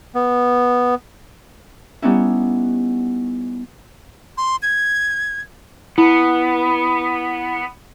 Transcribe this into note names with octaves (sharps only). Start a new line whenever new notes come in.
B3
G3 B3 C#4 D#4 E4
C6
G#6
B3 E4